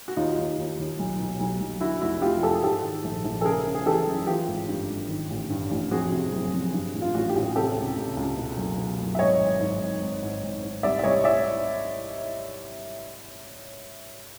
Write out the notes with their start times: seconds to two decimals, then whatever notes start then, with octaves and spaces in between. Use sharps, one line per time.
0.08 F#4
0.17 D#2 D#4 F4
0.38 D#2
0.58 D#2
0.79 D#2
0.99 B1
1.20 B2
1.40 B1
1.61 B1
1.81 D3 E4 F#4
2.01 F1 E4 F#4
2.22 F1 F4 G4
2.43 F1 G4 A4
2.54 G#4
2.63 G#2 G4 A4
2.83 D#3
3.04 A#1
3.25 A#1
3.41 A4
3.45 C#3 G#4 A#4
3.66 C#3
3.75 G#4
3.86 E3 G4 A4
4.06 F#2
4.27 E3 F4 G4
4.48 G#1
4.69 G2
4.89 G#1
5.09 D#3
5.30 A1
5.50 G2
5.71 A1
5.91 F2 F#4 G#4
6.12 C3
6.32 F#1
6.53 F2
6.74 G2
6.94 A1
7.02 F4
7.14 A1 F#4
7.29 G4
7.35 A1
7.42 G#4
7.56 C3 G4 A4
7.76 C#2
7.97 C#2
8.17 C#2
8.37 B2
8.57 F#1
8.78 B2
8.99 F#1
9.15 E5
9.19 G#1 C#5 D#5
9.41 G#1
9.60 G#2
9.81 G#1
10.02 G#1
10.23 G#2
10.43 G#1
10.63 G#2
10.83 C2 D5 E5
10.99 E5
11.04 C2 C#5 D#5
11.24 D5 E5